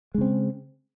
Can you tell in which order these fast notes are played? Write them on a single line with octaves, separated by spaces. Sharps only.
G#3 C#3 C4